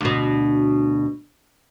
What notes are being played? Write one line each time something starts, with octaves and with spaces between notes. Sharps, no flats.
D2 B2